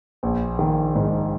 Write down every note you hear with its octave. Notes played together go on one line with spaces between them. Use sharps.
A#1
D#3
G#2